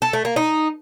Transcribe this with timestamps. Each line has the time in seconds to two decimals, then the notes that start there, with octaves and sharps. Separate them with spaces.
0.02 A4
0.13 A3
0.25 A#3
0.36 D#4